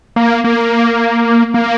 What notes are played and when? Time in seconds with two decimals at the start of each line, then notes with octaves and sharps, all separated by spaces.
0.16 A#3
0.44 A#3
1.54 A#3